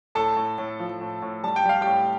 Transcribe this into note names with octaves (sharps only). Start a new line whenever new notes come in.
A2 A4 A5
A2
A2
F3
A2
A2
G3 A5
G5
G3 F5
A2 G4 G5